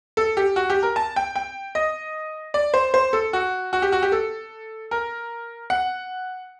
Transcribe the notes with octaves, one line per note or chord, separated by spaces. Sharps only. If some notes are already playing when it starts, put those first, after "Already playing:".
A4
G4
F#4
G4
A#4
A5
G5
G5
D#5
D5
C5
C5
A4
F#4
F#4
G4
F#4
G4
A4
A#4
F#5